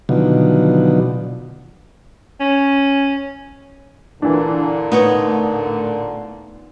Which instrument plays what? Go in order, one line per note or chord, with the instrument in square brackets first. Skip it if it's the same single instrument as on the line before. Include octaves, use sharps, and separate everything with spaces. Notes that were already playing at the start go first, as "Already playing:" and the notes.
[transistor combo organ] B2 D3 D#3 F3 F#3
[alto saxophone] C#4
[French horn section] A#2 D3 [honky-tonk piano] E3 D4
[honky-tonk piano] A2 [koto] B3 D#4 C#5